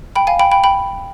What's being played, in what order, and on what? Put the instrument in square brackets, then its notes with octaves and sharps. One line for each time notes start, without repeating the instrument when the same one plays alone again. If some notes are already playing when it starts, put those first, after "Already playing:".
[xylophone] G5 B5
F5 G#5
G5 B5
G5 B5
G5 B5